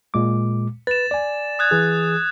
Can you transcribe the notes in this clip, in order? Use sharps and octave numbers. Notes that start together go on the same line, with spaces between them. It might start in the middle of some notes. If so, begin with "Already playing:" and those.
A#2 G#3 D6
B4 A6 E7
D5 G#5
D#6 F#6 G#6
E3 G#4